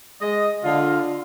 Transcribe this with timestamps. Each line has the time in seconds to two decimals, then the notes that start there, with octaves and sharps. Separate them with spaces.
0.21 G#3 D#5
0.64 D3 F4